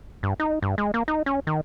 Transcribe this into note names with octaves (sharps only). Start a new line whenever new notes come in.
G2
D#4
G2
G#3
A#3
D#4
C#4
D#3